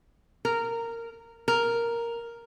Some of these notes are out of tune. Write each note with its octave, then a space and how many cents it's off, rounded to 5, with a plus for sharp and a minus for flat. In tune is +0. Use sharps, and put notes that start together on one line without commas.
A#4 -15
A#4 +0